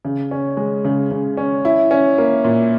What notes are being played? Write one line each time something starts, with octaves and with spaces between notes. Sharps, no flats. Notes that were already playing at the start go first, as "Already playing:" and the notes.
C#3
C#4
G#3
C#3
C#3
C#4
E4
C#4
A#3
A#2